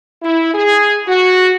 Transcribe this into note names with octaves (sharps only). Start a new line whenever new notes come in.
E4
G#4
F#4